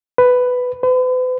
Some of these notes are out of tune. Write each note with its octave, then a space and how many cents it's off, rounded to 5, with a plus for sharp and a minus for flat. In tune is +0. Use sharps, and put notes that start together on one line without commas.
B4 +10
B4 +45